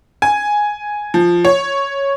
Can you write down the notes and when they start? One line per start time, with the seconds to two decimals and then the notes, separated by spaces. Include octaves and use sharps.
0.22 G#5
1.14 F3
1.45 C#5